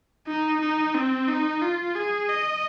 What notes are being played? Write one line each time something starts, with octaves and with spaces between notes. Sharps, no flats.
D#4
D#4
C4
D#4
F4
G#4
D#5